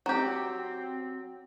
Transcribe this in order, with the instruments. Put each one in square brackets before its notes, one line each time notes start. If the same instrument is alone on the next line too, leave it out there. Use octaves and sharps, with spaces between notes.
[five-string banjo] F#3 G4 [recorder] C4